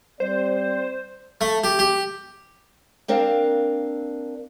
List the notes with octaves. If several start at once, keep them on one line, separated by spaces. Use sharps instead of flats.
G3 C4 C5 D5
A3
G4
G4
A#3 C4 D4 A#4 F5